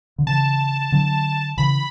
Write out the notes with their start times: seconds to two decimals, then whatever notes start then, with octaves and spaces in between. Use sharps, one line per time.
0.18 D3
0.26 C#3 E3 A5
0.92 D3 F#3
1.57 C#3 E3 B5